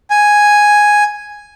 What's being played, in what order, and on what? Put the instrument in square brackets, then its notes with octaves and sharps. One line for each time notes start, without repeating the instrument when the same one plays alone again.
[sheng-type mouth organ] G#5